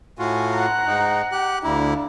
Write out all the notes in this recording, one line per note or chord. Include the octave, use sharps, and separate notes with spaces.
A2 F4 F#4 G#5
F#5 A#5 F#6
G#2 D#4
G4 F#6
D2 D4 E4 F5 A#5